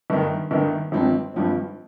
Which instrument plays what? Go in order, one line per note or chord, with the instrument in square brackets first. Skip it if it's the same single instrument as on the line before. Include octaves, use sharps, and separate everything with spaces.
[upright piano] G1 G2 D#3
G1 G2 D#3
G#1 G2 F3 C4
G#1 G2 F3 C4